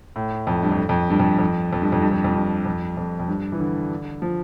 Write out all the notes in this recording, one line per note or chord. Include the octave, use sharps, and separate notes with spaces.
A2
F2
G2
F2
F2
G2
F2
F2
F2
G2
F2
G2
F2
F2
G2
F2
F2
F2
G2
E3
D3
F3